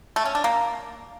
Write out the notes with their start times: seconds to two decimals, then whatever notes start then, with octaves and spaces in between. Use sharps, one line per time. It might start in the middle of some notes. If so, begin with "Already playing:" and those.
0.16 A3
0.25 C#4
0.35 D4
0.44 A#3